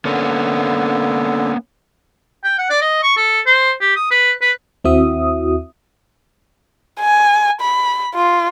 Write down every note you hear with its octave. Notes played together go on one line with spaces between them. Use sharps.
D3 A#3 B3 C#4
G5
F#5
D5
D#5
C#6
A4
C5
G4
D#6
B4
B4
D#2 C4 E4 F#4 E5 D#6
G#5
B5
F4